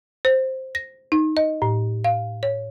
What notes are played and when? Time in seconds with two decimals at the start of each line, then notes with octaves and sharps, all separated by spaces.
0.25 C5
0.75 A#6
1.12 D#4
1.37 D#5
1.62 A2
2.04 F5
2.43 C#5